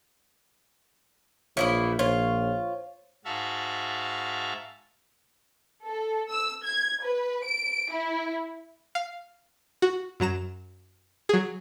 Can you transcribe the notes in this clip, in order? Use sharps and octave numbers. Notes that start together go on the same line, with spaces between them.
A#1 E3 F3 E4 C#5
A#1 F4 C5 C#5
G#2 F#4 E5 F5 A5
A4
E6
G#6
B4
D7
E4
F5
F#4
F#2 F#3 A#5 E7
F#3 G#4